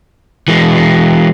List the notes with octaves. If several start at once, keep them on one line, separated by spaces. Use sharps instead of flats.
E3 G#3